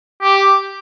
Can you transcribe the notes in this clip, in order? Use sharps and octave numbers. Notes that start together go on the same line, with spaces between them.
G4